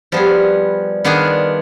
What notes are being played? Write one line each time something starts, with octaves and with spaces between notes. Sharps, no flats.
F3 G3 B3 F4 G#4
D#3 B3 D4 F4 G#4